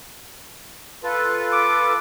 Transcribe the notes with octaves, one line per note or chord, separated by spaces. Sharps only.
F4 A4 B4
D6